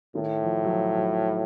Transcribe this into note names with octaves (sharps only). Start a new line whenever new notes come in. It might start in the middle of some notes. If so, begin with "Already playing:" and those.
A2 D#3
F3
F#3
F3
F#3